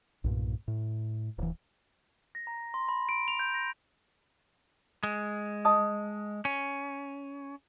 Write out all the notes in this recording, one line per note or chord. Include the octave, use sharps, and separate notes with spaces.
B1 G2 A#2
A2
D1 E3
A#6
A#5
C6
B5
D7
F7
G6
A#6
G#3
D#5 A5 D#6
C#4